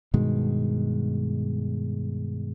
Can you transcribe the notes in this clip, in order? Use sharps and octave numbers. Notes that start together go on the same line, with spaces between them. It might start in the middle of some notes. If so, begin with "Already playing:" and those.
G2 B2 D#3 G#3